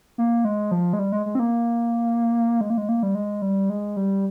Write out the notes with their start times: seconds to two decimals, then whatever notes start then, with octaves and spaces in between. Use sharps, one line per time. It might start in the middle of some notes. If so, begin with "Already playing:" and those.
0.18 A#3
0.45 G#3
0.71 F3
0.93 G#3
0.99 G3
1.12 G#3
1.26 G#3
1.35 C4
1.39 A#3
2.61 G#3
2.70 A#3
2.77 G#3
2.89 A#3
3.03 G3
3.15 G#3
3.42 G3
3.70 G#3
3.97 G3